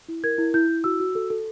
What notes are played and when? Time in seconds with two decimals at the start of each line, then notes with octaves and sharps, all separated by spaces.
0.09 E4
0.24 A#4 G#6
0.38 E4
0.54 E4 G6
0.69 E4
0.84 F#4 E6
1.00 F#4
1.15 A4
1.30 A4